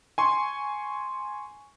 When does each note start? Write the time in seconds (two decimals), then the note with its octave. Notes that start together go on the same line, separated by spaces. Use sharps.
0.18 G#5 C6 C#6